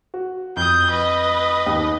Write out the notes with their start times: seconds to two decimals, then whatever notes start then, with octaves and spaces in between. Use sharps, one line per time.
0.14 F#4
0.56 F2 D#6 G6
0.90 B4 D#5
1.67 D#2